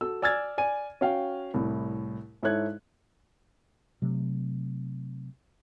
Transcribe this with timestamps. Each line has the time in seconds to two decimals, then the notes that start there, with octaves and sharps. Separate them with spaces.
0.01 F#4 A4 E6
0.22 D5 G#5 E6 F6 G#6 A6
0.58 D5 G#5 D#7
1.01 C#4 F#4 F5 G5
1.54 C2 A2
2.43 G#2 E4 A4 C#5 F#6 G#6
4.02 C3 F#3 A3